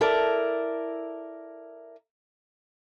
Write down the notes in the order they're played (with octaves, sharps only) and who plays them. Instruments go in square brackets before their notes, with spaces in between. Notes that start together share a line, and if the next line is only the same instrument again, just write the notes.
[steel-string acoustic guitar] E4 A4 A#4 D5